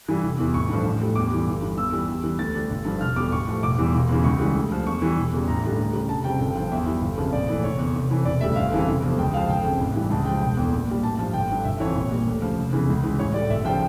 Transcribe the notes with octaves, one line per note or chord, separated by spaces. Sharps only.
G2 E3 G3
F1
E2 E3
A1 C#6
G2 D3 F3
A1
A2 G3
E2 D6
E3 G3
G1
G2 E3
E2 E6
E3 G3
E2
E3 G3
D2 A6
D3 G3
G1
G2 D3 F3
E1 F6
E2 D3 G3 D6
A1 C#6
A2 F3
E1 D6
E2 E3 G3
E1
E2 C#3 E3
C#2 C#6
C#3 E3 G3
D2
D3 F3
E2 C#6
E3 G3
E1
E2 C#3 G3
A1 A#5
G2 D3 G3
D2
C#3 G3
F1 A5
F2 C#3 G3 G5
G1 G5
G2 F3 G5
E2 E5
E3 G3
G1
F2 C#3 F3
A#1 D5
A2 E3
F1 C#5
E2 D3
F1
F2 E3
E1 D5
D2 C#3 G3 E5
G1 F5
F2 C#3 E3 G3
F1
E2 D3 F3
C#2 G5
C#3 F3 F5
G1 G5
F2 C#3
A1
G2 E3 G3
C#2 A5
C#3 F3 G5
E1 G5
E2 D3
A#1
A#2 G3
A1 A5
G2 F3 A5
G1 G5
G2 D3
G1 E5
F2 E3 C#5
A#1 C#5
A#2 G3
D2
C#3 F3
F1
E2 C#3 E3
C#2
C#3 E3
A1 C#5
A2 G3 D5
G1 E5
C#3 F3 G5